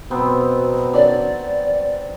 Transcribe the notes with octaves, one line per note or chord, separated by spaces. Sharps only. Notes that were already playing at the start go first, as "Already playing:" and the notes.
B2 F#3 B3 C4
D#3 C#4 D4 D5